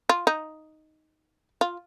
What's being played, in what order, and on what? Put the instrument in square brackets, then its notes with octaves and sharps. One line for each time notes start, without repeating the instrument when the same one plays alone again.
[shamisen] F4
D#4
F4